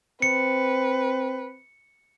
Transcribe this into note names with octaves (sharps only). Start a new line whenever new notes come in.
C4 B4 C#7